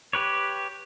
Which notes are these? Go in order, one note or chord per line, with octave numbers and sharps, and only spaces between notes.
G4 B4 C#5